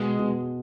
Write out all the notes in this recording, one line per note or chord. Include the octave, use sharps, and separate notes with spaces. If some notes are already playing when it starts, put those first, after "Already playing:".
Already playing: B2 G#3
B2